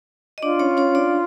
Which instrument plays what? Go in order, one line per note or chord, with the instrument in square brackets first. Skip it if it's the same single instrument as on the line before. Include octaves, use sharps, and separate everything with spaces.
[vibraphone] D#5
[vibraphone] D4 D5 [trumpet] F4
[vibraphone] C#4 C#5
C#4 C#5
D4 D5